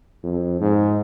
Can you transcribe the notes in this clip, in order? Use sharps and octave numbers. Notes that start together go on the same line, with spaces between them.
F2
G#2